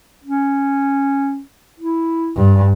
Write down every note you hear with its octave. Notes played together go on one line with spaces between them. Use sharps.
C#4
E4
G2